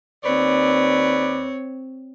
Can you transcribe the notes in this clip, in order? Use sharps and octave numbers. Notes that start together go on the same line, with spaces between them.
D#2 C4 B4 C#5 D5